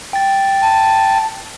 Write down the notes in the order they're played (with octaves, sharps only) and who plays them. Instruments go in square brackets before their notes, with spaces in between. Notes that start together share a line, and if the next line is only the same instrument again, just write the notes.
[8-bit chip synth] G5 A6
[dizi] A5